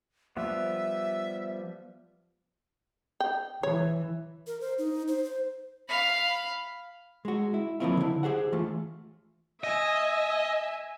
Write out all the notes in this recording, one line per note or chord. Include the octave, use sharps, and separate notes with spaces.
F3 G3 B3 E5
G5
E3 C#5
A#4
C5
D#4
C5
C5
F5 B5
G#3 F#4
E4
F3 F#3 A#3 C4 E4 F4
D3 E4
G4 G#4 C5 F#5
E3 A3 F4
D#5 E5 G#5